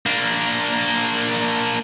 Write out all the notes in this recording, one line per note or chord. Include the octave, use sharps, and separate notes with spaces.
A#3 D4